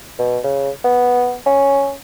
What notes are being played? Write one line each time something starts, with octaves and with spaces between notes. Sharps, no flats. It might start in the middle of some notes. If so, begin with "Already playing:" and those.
B2
C#3
B3
C#4